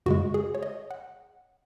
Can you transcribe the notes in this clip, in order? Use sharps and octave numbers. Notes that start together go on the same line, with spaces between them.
F#2 C#3 G#3 F#4
G#4
C#5
D#5
F#5